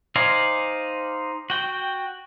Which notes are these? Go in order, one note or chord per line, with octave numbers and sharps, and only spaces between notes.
D#4 C5 D5 F5 G#5
F#4 G5